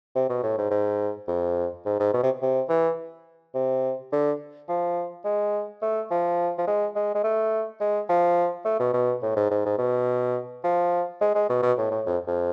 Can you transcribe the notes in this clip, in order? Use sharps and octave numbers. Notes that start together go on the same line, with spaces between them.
C3
B2
A2
G#2
G#2
F2
G#2
G#2
B2
C3
C3
E3
C3
D3
F3
G#3
A3
F3
F3
G#3
G#3
G#3
A3
G#3
F3
A3
B2
B2
A2
G#2
G#2
G#2
B2
F3
G#3
G#3
B2
B2
A2
A2
F2
F2